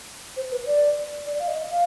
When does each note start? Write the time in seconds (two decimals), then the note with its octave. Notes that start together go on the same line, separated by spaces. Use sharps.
0.36 C5
0.51 B4
0.66 D5
1.26 D5
1.39 F5
1.48 D#5
1.70 F5